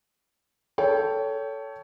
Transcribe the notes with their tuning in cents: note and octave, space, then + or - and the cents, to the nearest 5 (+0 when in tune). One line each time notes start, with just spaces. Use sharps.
A4 +0 C#5 +20 G5 +0